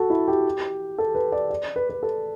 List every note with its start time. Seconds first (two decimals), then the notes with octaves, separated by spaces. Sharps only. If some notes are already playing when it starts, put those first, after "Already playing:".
Already playing: F#4 A4
0.10 E4
0.28 G4
0.98 A4
1.15 B4
1.32 D5
1.50 D5
1.76 B4
1.89 B4
2.03 A4